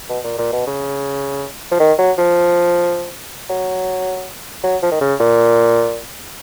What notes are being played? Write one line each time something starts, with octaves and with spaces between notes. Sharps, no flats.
B2
A#2
A#2
B2
C#3
F3
D#3
F#3
F3
F#3
F#3
F3
D#3
C#3
A#2